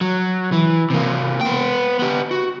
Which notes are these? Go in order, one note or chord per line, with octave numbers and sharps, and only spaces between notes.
F#3
E3
C3 A#3
B3 G5
B3 G4
F#4